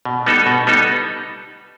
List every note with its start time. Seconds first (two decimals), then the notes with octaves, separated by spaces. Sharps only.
0.05 B2
0.26 G3 B3 D#4 A4
0.46 B2
0.67 G3 B3 D#4 A4